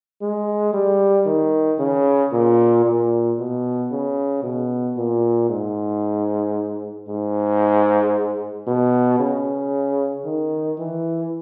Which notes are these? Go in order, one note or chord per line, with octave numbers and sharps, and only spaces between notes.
G#3
G3
D#3
C#3
A#2
A#2
B2
C#3
B2
A#2
G#2
G#2
B2
C#3
D#3
E3